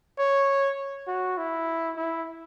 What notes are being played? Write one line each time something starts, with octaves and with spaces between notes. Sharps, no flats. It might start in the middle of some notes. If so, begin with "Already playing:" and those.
C#5
F#4
E4
E4